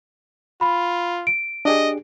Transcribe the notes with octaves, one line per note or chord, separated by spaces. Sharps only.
F4 B5
D7
D4 G4 G#4 D#5